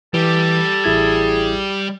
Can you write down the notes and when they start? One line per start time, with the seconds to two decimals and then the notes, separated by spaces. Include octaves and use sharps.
0.14 E3 G3 A4
0.84 A1 E4 G#4 G#6